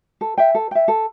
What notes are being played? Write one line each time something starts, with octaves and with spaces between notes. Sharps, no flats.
A4
E5 G5
A4
E5 G5
A4